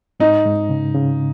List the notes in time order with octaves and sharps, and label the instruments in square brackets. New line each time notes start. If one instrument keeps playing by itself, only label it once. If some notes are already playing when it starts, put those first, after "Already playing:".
[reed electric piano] G#2 [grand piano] D#4
[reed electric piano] G#2
C#3
C#3